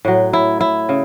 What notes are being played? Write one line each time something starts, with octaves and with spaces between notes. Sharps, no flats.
A2 F#3
E4
E4
C#3